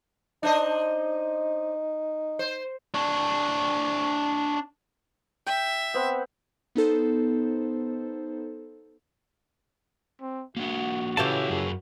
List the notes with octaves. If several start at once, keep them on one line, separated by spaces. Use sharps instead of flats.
D4 D#4 C5 D#5
C5
D4 C#5
E5 G5
B3 C4 F#5
B3 D#4 A4 C5
C4
A#3 D4 F#4 F#5
C#3 E3 C#4 F4 G4 A4 A5
F#2 G#4